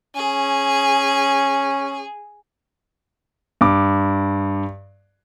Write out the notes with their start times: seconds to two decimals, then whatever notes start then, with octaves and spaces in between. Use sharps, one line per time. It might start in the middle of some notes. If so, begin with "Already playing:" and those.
0.16 C#4 G#4
3.61 G2 D6